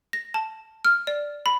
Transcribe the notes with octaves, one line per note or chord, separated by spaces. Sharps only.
A#6
A5
F6
D5
B5